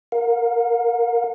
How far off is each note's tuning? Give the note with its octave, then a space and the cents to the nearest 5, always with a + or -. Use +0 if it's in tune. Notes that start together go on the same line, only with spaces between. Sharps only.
A#4 +0 F5 +40